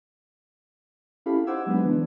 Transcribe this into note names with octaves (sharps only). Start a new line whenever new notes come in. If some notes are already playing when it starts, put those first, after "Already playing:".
C#4 E4 G4 A4 F5 B5
D#4 C5 F#5 D6 E6 G#6
F#3 G#3 B3 D4 B4
E3 B3 D4